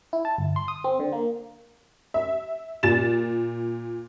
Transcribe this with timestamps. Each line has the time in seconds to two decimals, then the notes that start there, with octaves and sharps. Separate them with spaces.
0.13 E4
0.25 A5
0.38 G1
0.56 C6
0.68 D#6
0.84 C4
1.00 D3
1.13 A#3
2.14 E5
2.83 A#2 A6 E7